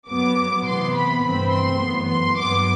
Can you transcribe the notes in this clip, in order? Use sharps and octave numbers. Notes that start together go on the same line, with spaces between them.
F#2 F#3 B3 D6
C3 E3 B3 C6
B5
G2 E3 A3 C4 B5
C6
F#2 E3 B3
C6
G2 F#3 B3 D6